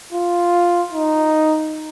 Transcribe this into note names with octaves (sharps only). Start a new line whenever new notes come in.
F4
D#4